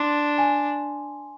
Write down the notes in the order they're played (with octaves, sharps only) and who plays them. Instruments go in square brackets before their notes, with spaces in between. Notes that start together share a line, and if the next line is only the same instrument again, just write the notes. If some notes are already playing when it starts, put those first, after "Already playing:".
Already playing: [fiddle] D4 [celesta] C6
[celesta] G#5